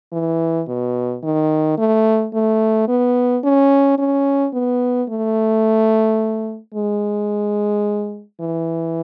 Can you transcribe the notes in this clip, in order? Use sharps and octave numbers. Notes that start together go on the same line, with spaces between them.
E3
B2
D#3
A3
A3
B3
C#4
C#4
B3
A3
G#3
E3